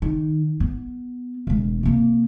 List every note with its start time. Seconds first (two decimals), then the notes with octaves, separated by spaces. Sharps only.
0.02 D#3
0.60 B3
1.47 E1 G#3
1.83 C3 A#3